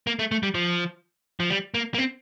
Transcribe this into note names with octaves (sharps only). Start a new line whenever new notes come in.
A#3
A3
A3
G3
F3
F3
G3
A#3
A#3
C4